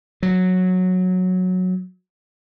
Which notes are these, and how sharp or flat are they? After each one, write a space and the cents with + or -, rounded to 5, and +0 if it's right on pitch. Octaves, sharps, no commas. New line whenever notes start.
F#3 -10